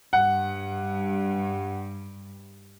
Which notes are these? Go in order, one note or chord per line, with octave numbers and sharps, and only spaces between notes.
G2 F#5